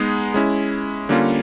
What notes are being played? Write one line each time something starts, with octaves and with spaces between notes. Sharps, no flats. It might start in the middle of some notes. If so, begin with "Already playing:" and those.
Already playing: G#3 B3 D#4 G#4
G#3 C#4 E4
D3 G3 A#3 C#4 F4